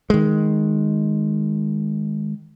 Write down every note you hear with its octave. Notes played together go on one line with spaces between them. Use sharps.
D#3 G#3